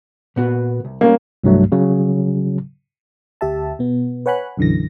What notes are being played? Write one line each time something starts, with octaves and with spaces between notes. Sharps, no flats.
A#2 B3 F#4
C2
G3 A#3 C#4
C2 G2 F#3 A3
C#3 F#3
D2 G4 E5 A5
B2 B3
B4 C#5 F#5 G#5 B5 F#6
B1 F#2 D3 E3 A#6